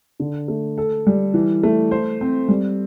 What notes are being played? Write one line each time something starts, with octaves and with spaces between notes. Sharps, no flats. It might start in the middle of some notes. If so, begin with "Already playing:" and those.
D3
A3
A4
G3
E3
A3
C5
C4
G3